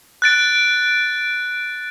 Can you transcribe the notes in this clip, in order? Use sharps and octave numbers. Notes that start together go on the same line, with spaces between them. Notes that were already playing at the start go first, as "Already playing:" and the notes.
F#6 A6 D7